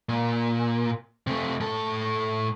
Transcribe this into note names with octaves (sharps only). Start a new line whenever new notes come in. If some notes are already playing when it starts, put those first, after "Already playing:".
A#2
C3 A3
A2 A4